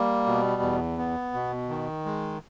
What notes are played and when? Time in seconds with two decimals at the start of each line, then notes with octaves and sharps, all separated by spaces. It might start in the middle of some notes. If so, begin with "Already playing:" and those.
Already playing: G3 A#3
0.26 B2
0.62 E2
0.98 B3
1.34 B2
1.69 D#3
2.05 G#3